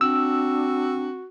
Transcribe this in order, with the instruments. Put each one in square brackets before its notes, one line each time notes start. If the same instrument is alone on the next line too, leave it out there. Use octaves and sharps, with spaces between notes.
[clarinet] C4 [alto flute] D4 [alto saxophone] F#4 [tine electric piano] E6